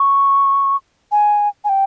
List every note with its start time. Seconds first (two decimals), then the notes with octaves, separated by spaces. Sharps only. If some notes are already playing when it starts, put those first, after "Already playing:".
Already playing: C#6
1.12 G#5
1.64 G#5
1.69 G5